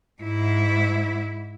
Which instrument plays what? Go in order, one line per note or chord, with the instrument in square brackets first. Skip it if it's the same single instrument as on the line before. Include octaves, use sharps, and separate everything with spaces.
[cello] G#2 E4